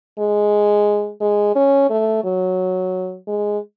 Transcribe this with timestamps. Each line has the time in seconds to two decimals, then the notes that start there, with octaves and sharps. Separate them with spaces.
0.19 G#3
1.21 G#3
1.56 C#4
1.90 A3
2.24 F#3
3.28 G#3